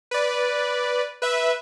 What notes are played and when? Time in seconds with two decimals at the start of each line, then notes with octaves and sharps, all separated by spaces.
0.11 B4 D5
1.22 B4 E5